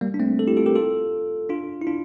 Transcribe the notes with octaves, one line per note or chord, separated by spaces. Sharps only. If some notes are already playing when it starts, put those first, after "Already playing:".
G3 A#3
D4
A3 C4
A4
E4 G4
F4 A4
G4 A#4
F4 A4
D4 F4
E4
D4 F4